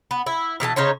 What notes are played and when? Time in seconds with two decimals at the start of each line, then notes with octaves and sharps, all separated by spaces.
0.11 B3
0.26 E4
0.60 B2 E3 G#4 A5
0.76 C#3 D#4 C5 C#5